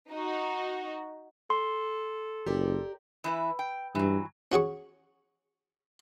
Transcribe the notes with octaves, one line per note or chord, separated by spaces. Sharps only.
D#4 F#4
A4 C6
F#1 G4 A#4 D5
E3 E4 B4
G5
G2 E3 F#3
C#4 F#4 G#4 C#6